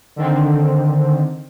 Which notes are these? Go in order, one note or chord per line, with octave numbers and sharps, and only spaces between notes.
D3 D#3 C4